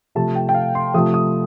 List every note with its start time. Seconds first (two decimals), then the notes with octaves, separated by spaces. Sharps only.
0.15 C3 F3 A3 A5
0.35 G5
0.49 G5
0.54 F5
0.75 C6
0.94 C3 F3 A3 D#6
1.14 D#6